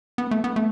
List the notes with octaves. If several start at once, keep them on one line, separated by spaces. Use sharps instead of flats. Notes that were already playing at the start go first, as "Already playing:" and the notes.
B3
A3
B3
A3